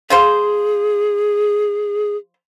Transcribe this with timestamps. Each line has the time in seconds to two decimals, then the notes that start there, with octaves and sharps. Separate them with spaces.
0.10 F3 F4 G#4 C5